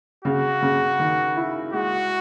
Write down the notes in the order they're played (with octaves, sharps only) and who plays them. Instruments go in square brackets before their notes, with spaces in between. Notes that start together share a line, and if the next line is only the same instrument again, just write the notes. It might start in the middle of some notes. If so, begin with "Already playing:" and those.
[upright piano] C#3 [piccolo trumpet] F#4
[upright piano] C#3
D#3
E4
[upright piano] G#3 [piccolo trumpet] F#4